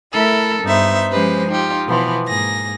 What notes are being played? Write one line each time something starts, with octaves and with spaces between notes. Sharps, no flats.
A3 E4 A4 A#4
G2 B3 D#4 C5 E5
F3 G#3 C#4 G4 B4 C5
D#4 F4 G4
B2 E3 F3 B3
G#2 A#3 G#4 A#6